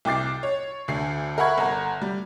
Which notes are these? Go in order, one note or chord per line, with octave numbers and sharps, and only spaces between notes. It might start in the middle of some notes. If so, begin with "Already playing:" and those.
C2 G5 D6 A6 C7
C#5
D2 D3 C7
A#4 E5 F#5 B5 C#6 G#6
G1 F#5 A#5
G3